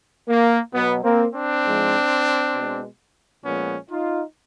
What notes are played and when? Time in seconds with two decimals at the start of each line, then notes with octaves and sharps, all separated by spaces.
0.29 A#3
0.74 B2 F#3 B3
1.04 A#3 C4
1.34 C4 D4
1.64 G#2 F3 G#3
2.55 B2 G#3
3.45 A#2 F3 G#3 B3 C#4
3.90 D#4 F4